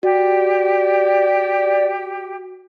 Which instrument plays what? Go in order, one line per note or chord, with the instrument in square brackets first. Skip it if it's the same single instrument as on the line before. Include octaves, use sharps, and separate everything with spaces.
[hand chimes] F#4 [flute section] G4 [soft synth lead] D5